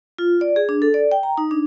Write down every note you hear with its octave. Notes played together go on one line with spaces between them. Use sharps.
F4
D5
G#4
D4
A4
D5
G5
A#5
D#4
D4